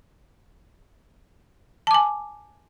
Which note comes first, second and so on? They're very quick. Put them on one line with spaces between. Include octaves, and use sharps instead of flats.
A5 D6 G#5